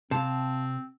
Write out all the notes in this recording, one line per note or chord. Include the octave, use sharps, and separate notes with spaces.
C3 C4 F5 A5